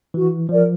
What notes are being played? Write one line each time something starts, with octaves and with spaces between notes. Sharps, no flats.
E3 F#4
F3 A#4 D5